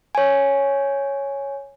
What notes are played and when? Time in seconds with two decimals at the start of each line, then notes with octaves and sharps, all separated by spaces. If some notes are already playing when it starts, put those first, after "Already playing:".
0.15 C#5 G#5